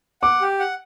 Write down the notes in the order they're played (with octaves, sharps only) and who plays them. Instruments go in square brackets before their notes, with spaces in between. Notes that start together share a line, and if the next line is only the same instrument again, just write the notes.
[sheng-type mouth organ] F#5 [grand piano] D6
[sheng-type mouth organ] G4
F#5